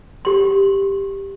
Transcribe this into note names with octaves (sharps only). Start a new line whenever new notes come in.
G4 C6